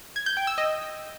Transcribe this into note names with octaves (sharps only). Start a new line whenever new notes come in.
G#6
G6
G5
E6
D#5